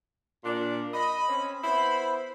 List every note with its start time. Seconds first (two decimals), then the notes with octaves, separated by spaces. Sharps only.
0.44 A#2 D4
0.93 D#5 B5
1.29 C4 C#4
1.63 B3 E4 C5 B5